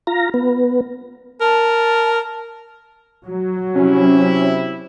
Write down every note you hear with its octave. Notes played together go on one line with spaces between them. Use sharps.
F4 A#5
B3
A#4 A5
F#3
C3 C#4 E4